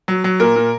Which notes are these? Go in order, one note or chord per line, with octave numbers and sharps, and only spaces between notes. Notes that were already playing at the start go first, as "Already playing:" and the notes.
F#3
F#3
A#2 A#4
A#2